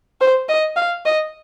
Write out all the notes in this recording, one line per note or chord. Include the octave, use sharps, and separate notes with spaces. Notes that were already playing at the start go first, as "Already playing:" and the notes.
C5
D#5
F5
D#5